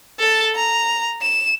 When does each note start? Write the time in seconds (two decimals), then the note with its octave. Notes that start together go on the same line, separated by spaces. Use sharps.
0.19 A4 A5
0.56 A#5
1.22 E7